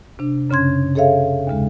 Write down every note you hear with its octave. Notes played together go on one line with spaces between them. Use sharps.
C3 D4
F#2 C#3 C#4 C6 G#6
G#4 A4 C#5 E5 F5
D#2 C#3 G#3